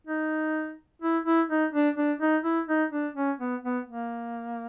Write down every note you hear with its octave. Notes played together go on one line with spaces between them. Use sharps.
D#4
E4
E4
D#4
D4
D4
D#4
E4
D#4
D4
C#4
B3
B3
A#3